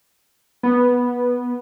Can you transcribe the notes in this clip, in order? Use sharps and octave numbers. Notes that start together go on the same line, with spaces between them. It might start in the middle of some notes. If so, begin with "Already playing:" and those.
B3